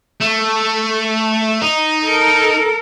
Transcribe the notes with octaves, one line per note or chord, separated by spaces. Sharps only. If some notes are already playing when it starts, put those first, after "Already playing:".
A3
D#4
A4 A#4